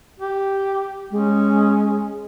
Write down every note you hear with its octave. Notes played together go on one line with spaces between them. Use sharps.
G4
G#3 C#4